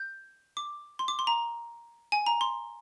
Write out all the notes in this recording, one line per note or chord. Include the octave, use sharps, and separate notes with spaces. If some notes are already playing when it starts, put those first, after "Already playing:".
Already playing: G6
D6
C6
D6
C6
A#5
G#5
A#5
C6